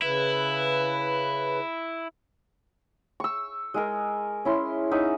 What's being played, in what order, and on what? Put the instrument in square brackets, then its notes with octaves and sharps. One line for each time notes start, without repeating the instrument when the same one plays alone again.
[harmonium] C#3 B4 [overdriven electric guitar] E4
[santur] C#6 E6
G#3 G#4 A#4
C#4 E4 C6
C#4 D#4 E5 F#5